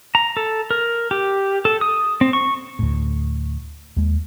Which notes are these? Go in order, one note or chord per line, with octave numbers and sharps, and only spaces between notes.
A#5
A4
A#4
G4
A4
D#6
C4
C#6
D2 A2
D#2 G#3